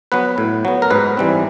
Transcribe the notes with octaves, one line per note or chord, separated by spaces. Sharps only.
F#3 B3 B4
A2
F#3 B3
A#4
G#2 B4
E3 G3 C4